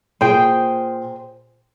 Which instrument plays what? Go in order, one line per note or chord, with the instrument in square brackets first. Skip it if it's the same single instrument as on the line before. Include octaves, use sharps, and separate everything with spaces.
[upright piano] A#2 [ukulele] G#4 C5 G5